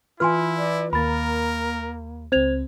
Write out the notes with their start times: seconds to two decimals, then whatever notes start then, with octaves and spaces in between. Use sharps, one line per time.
0.20 E3 E4 F4 B4 G#5 C6 F6
0.57 D5
0.93 D#2 A#3 A#4 B5 A6
2.32 C#2 C4 C5 G#6 F7